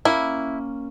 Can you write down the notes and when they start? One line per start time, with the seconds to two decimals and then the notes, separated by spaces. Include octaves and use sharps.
0.05 A#3 C#4 E4